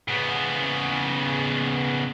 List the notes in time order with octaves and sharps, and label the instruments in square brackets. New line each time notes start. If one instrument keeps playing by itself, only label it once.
[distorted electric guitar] C#3 B3